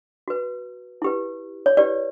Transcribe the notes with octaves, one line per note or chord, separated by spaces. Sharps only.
F#4 B4
E4 G4 B4
C#5
E4 G4 B4 D5